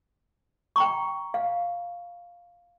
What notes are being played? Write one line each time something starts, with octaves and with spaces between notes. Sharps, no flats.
G5 A#5 C#6
F5